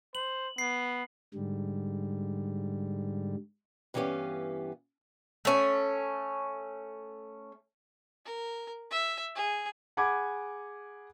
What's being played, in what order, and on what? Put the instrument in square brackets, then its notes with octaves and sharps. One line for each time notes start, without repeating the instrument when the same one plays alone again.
[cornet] C5 [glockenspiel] F#7
[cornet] B3 [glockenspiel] C7
[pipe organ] G#2 D3 G3
[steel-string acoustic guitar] G2 E3 B3 C#4 G4 F5
[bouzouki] A3 C#4
[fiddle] A#4
E5
G#4
[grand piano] G#4 F#5 G#5 B5 D6 G#6